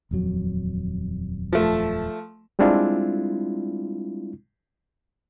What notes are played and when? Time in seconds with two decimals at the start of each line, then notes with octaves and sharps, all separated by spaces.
0.11 D#1 F2 F#3
1.53 F3 A3
2.59 G3 G#3 C4 D4 E4 F4